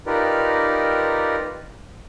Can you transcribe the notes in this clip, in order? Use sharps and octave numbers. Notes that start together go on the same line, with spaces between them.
D#4 F4 G4 A#4 B4 D5